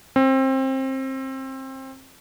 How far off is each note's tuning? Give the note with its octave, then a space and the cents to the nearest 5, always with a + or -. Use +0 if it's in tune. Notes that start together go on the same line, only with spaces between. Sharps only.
C4 +25